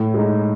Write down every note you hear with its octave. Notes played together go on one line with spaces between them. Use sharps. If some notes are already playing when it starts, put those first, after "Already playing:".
Already playing: A2
G#3 D#4